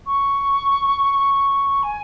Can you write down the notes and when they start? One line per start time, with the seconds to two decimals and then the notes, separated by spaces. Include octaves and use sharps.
0.06 C#6
1.83 G#5